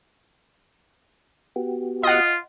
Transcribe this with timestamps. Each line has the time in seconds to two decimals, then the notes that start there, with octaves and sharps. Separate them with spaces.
1.56 B3 F#4 G4
2.03 F4 D#5 F#5